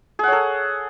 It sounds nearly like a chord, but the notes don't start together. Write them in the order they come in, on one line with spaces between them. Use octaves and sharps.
G#4 F#5 C#5 A4